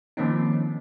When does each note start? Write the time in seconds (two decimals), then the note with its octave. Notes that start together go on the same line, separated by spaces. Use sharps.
0.17 D#3 F3 A#3 C4 C#4 D#4